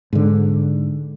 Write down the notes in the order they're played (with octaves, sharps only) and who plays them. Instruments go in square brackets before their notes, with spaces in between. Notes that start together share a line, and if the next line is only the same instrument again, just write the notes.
[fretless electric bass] G#2 D3